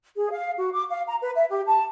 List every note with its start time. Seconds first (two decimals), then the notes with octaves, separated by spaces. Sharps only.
0.17 G#4
0.30 F5
0.58 F#4
0.72 D6
0.90 F5
1.07 A#5
1.21 B4
1.36 E5
1.50 G4
1.66 A5